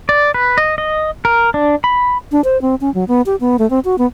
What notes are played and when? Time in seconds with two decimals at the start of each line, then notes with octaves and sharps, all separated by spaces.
0.09 D5
0.34 B4
0.58 D#5
0.78 D#5
1.25 A#4
1.54 D4
1.84 B5
2.32 D4
2.44 C5
2.62 C4
2.81 C#4
2.94 F#3
3.08 B3
3.26 G4
3.41 B3
3.59 A3
3.70 C4
3.85 F#4
3.98 B3